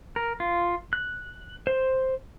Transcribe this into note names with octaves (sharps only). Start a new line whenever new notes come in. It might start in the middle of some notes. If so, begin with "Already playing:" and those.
A#4
F4
F#6
C5